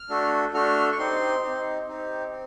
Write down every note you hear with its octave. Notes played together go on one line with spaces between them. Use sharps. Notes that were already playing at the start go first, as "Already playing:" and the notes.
Already playing: F6
A3 D4 F#4 A4
A3 D4 F#4 A4 F6
C#6
C4 D#4 G4 C6
C4 D#4 G4
C4 D#4 G4
C4